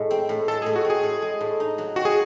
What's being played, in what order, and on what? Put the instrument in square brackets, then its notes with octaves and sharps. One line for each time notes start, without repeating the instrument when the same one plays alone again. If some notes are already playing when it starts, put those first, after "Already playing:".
Already playing: [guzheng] A2 G#3
C4
A2
[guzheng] G#3 [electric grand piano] A4
[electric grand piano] G#4
[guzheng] A2
[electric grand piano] F#4
[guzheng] C4
[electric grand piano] G#4
[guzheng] A2
G#3
A2
D#4
F#3
[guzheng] C4 [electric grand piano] F#4
[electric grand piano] G#4